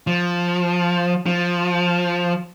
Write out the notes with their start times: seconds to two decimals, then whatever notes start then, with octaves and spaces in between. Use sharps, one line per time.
0.07 F3
1.26 F3